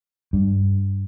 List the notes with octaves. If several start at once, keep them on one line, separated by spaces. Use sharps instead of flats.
G2